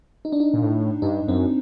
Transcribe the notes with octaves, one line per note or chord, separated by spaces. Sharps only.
D#4
D4
D#4
A#2
A2
G2 D#4
F#2 C4